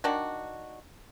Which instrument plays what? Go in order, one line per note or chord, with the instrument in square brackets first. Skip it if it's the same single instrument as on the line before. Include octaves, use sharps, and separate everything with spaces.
[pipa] D#3 D4 F#4